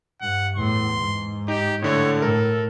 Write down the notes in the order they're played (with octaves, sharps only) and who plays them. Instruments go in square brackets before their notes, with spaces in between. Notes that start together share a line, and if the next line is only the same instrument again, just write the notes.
[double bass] G2 [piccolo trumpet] F#5
[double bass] E2 A2 [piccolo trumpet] C6
[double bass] G#2
[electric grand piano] D#4 [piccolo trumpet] G4
[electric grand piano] A2 D3 A3 [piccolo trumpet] C#5
[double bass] A2 [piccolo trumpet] A4 [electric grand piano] A#4